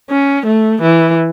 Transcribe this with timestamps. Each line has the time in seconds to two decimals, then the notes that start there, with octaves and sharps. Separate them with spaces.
0.10 C#4
0.46 A3
0.82 E3